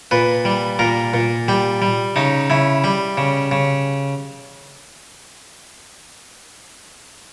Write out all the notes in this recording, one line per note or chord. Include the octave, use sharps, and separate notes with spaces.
A#2 B4
G3
A#2 A#4
A#2
G3 G4
G3
C#3 D#4
C#3 E4
G3 G4
C#3
C#3